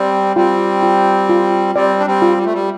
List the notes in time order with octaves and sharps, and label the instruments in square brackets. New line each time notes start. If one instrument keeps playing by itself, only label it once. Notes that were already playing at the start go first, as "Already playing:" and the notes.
Already playing: [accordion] G3 C4 [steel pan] D5
[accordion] G3 C4 [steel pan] F4
[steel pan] F4
F4
[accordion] G3 C4 [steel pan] D5
[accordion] D4
G3 C4
[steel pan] F4
[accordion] G3
A3
G3